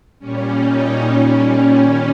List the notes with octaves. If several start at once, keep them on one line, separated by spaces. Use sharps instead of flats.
A#2 G3 C#4
D#4
A#2 G3 C#4
D#3 G3